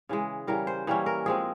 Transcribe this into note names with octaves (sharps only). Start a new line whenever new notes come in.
C#3 E3 G#3
C#3 E3 G3 A#4
C5
E3 G3 A#3 C#4
A#4
F3 G#3 C4 G#4